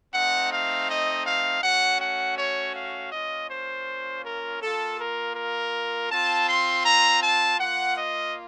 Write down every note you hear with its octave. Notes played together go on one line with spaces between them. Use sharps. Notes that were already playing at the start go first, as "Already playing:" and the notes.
A3 C4 D#4 F#5
F5
D#5
F5
A3 C#4 F#4 F#5
F#5
C#5
F5
A#3 C#4 F4 D#5
C5
A#4
A#3 F4 A4
A#4
A#4
C4 F4 A5
C6
A#5
A5
A#3 F4 F#5
D#5